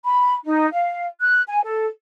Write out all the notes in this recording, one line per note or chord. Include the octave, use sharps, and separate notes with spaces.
B5
D#4
F5
F#6
G#5
A4